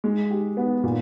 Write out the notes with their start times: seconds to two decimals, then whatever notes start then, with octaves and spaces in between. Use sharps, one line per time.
0.04 G#3
0.30 G4
0.57 B3
0.84 A#2